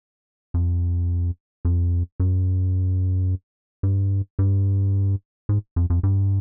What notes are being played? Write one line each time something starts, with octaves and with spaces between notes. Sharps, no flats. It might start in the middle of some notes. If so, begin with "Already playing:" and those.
F2
F2
F#2
G2
G2
G#2
F2
F2
G2